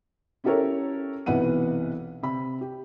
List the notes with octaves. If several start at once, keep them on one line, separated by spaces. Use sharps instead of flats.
C#4 E4 G4 A4 A#4 C#5
B1 C3 E3 B4 F#5 D#7
C3 B5
G4